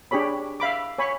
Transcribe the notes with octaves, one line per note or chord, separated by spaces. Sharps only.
D4 G4 G#4 C#5 B5
E5 F5 B5 D6
C#5 G#5 B5 C#6